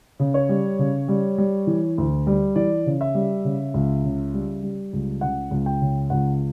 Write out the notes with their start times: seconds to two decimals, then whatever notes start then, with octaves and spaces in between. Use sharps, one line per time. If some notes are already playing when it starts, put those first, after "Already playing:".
0.20 C#3
0.34 C#5
0.49 G3
0.79 C#3
1.08 G3
1.38 G3
1.67 E3
1.98 D2
2.27 G3
2.56 E3 D5
2.86 C#3
3.01 E5
3.15 G3
3.45 C#3
3.74 C#2
4.04 C#3
4.34 G3
4.63 G3
4.93 C#2
5.21 C#3 F#5
5.51 C#2
5.66 G5
5.82 C#3
6.10 C#2 F#5